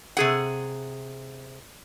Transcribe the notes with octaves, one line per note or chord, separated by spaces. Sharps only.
C3 G#4 F#5